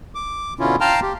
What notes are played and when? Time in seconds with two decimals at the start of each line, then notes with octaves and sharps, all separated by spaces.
0.15 D6
0.59 B2 D3 C#4 E4 F4
0.81 F5 G5 A5 A#5 C6 F6
1.02 G4